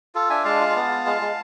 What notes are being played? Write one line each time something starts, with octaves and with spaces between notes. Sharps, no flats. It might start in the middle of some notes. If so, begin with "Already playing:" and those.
F4 A4
D4 E5 G#5
G#3 F5 A5
F4
B3
F4
G#3
G#3